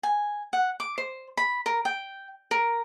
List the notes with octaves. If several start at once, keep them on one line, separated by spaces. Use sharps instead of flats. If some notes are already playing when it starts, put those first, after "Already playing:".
G#5
F#5
D6
C5
B5
A#4
G5
A#4